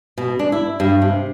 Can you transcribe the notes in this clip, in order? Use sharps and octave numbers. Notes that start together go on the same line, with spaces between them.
B2
D4
E4
G2
C3